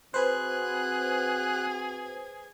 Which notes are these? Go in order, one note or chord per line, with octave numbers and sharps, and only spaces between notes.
C4 F#4 G#4 B4 C5 F#6